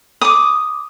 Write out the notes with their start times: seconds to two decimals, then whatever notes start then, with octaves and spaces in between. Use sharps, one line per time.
0.21 D6 D#6